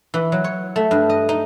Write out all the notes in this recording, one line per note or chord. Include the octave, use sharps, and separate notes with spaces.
E3
F#3
C#5
A3
G2
D#5
D#4